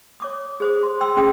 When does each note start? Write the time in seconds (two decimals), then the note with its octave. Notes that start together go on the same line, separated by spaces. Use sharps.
0.20 C#5 D6 D#6
0.60 G#4 C5 D#6
0.83 C6
1.01 G5 C6 E6
1.16 C#4 G#4 G5 D#6